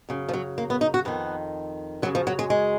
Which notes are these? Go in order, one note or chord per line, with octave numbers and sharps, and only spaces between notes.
F#2 C#3
F3
F#3
A#3
B3
D#4
F#4
F2 D#3 B3
F#2 C#3 F#3
F3
F#3
G#3
G#3